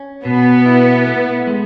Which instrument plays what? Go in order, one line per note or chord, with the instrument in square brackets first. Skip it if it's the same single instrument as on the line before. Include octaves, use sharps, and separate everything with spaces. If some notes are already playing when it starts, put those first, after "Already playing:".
Already playing: [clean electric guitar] C#4
[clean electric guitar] B2 [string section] B3
[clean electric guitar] E4
A3
G#3